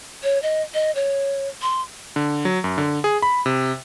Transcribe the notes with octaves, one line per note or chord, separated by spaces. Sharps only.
C#5
D#5
D#5
C#5
C6
D3
F#3
F#2
D3
G#4
B5
C3